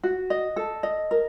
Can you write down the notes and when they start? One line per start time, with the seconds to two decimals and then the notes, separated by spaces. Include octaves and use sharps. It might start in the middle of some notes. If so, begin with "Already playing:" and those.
0.03 F#4
0.30 D#5
0.56 A4
0.83 D#5
1.11 A#4